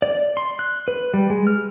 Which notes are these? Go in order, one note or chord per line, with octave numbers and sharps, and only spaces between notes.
D5
C6
F#6
B4
G3
G#3
F6